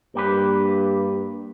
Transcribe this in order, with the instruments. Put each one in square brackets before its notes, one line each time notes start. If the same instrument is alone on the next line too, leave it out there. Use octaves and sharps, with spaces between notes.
[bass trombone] G2 [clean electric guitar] A#3 G4 B4